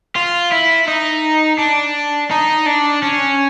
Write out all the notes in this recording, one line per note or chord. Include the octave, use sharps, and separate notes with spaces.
F4
E4
D#4
D4
D#4
D4
C#4